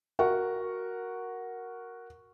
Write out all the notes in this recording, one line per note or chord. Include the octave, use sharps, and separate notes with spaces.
F#4 A#4 F#5 C#6